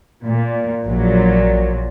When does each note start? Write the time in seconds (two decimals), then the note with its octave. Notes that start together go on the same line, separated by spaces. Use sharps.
0.25 A#2
0.85 A#1 A#2 F#3